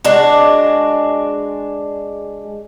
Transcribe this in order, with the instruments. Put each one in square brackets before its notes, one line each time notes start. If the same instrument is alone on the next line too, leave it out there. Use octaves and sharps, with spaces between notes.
[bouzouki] G#3 D4 F#4